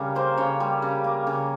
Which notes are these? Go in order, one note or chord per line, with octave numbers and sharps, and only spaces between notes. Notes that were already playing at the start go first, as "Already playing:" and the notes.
Already playing: C#3 G3 A#4
A#3 C5
C#3 C#5
G3
C#3
A#3
C#3